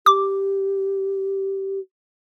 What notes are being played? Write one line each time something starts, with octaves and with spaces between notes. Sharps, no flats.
G4 D6